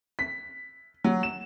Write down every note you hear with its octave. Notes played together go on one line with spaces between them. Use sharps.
B6
F#3
E7